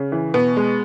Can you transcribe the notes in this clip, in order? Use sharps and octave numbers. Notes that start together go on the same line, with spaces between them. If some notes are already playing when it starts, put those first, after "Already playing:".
Already playing: C#3
E3
B2 B3
G#3